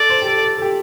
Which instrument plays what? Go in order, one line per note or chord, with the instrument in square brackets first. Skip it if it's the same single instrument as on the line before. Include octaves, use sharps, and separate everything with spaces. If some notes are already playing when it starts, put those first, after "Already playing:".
Already playing: [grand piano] A4 [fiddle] D5
[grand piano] C5
G4
A4
A4
A4
G4